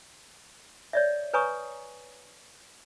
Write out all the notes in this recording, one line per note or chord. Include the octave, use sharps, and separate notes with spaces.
C#5 D5 E5
B4 C#5 G#5 A#5 C#6 D#6